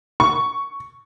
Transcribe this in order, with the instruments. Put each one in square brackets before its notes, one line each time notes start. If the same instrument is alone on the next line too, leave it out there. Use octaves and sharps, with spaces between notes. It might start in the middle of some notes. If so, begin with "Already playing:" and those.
[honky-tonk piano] C#6